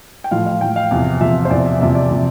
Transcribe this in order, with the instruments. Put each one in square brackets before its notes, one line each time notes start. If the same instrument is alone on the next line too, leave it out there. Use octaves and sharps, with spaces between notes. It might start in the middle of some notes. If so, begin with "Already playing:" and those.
[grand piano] G5
A2 F3 F5
F5
A2 F3 G5
F5
E2 C3 F3
E2 C3 F3 E5
C5
E2 C3 F3 D5
E5
E2 C3 F3 E5
D5
C3 F3